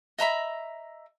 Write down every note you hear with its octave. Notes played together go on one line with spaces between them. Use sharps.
D#5 E5 A#5 B5